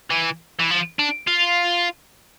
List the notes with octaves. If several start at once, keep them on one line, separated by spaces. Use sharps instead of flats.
E3
E3
F3
D4
F4